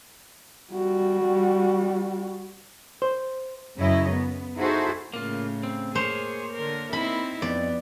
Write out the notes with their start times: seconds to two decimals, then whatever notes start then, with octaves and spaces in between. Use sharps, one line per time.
0.73 G3 F#4
3.02 C5
3.78 F#2 C#3 E4 C#5 D#5
4.10 B3
4.57 D#4 E4 F#4 G#4 A4 C5
5.13 A2 C#3 A#3 F4
5.63 C4
5.95 A#3 G#4 C5 C#5
6.54 D3 A#4
6.93 C4 D#4 E4 B5
7.42 F2 B3 D5